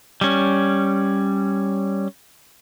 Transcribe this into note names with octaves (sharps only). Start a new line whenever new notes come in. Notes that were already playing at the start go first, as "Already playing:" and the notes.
G3 C#4